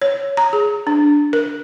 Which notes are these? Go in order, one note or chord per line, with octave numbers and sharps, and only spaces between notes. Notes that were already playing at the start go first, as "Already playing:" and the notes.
C#5
A#5
G#4
D4
A#4